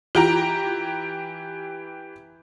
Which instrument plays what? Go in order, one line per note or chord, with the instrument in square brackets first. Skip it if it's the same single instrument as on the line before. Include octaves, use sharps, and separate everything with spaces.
[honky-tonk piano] E3 G4 A#5 [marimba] F4